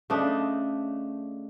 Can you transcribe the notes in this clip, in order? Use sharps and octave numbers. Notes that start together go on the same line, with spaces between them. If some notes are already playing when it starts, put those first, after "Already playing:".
C#3 A3 D4 D#5